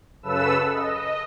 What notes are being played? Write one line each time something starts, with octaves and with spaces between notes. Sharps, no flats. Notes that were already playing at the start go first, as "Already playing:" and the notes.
F#2 C#3 A4 B4 E6
D#5